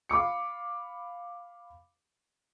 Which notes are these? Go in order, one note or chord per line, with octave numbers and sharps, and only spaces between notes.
F5 B5 D6 C#7